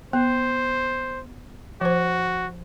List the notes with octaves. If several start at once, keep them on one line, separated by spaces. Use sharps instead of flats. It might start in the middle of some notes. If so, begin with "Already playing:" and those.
B3 C5
F3 F#4 C5